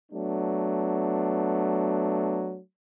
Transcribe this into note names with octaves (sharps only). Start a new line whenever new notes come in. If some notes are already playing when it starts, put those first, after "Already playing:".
F#3 A3 B3 D4